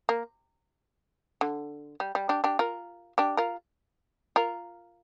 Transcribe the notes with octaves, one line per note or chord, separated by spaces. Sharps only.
A#3
D3
G3
G3
D4 G4
D4 G4
F4 A#4
D4 G4
F4 A#4
F4 A#4